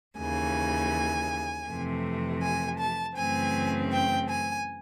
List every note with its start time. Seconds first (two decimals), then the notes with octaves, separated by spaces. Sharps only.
0.18 D#2 C#3 E3 G#5
1.67 F2 C3 E3 A3
2.42 G#5
2.79 A5
3.16 F#2 C#3 E3 A3 C4 G#5
3.92 G5
4.29 G#5